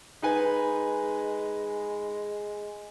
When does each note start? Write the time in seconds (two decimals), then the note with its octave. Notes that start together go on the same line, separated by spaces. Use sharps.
0.23 G#3 D#4 B4 G#5